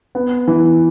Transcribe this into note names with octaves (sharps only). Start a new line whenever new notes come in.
B3
E3